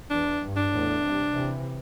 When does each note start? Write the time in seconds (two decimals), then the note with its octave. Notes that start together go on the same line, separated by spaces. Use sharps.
0.10 E2 D4
0.41 G2
0.57 D4
0.72 E2 A2
1.02 G2 C3
1.33 C3 E3